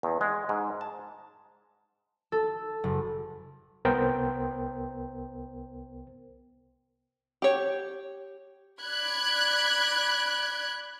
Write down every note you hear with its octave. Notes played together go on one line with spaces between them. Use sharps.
E2
G#3
G#2
A5
A4
F#1
C2 B3 A#4 C5 G5
G4 C#5
D5 B5 F#6 G#6